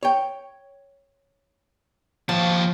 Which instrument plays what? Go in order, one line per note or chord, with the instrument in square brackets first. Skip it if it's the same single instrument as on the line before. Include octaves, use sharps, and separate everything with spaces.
[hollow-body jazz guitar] C#5 G5
[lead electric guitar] D#2 A5 [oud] F3